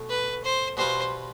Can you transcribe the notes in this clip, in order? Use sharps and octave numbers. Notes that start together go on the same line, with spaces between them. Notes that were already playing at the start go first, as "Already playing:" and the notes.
Already playing: B2 A3
B4
C5
B2 G3 B3 F4 C5